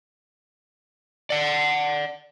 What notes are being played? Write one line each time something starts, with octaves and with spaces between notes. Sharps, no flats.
D5 F#5